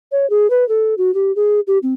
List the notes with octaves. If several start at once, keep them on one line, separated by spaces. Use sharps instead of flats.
C#5
G#4
B4
A4
F#4
G4
G#4
G4
C4